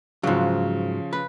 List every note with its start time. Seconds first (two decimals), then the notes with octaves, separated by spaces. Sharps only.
0.23 G#2 C#3 F3 F#3
1.13 B4